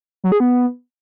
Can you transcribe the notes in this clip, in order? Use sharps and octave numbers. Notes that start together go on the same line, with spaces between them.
F#3
G#4
B3